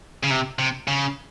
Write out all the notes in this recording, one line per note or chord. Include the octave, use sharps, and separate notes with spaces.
C#3
C3
C3
C#3